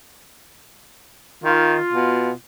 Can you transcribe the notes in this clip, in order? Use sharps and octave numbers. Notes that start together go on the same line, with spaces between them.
D#3 F4
B2